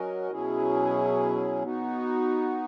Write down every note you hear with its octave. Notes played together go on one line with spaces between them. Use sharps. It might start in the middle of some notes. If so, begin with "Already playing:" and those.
Already playing: F#3 C#4 F#4 A#4 D#5
B2 F#3 C#4 E4 G#4
B3 D#4 F#4